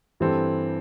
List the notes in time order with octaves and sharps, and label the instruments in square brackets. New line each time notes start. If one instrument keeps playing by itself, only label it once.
[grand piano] G2 E3 C4 A4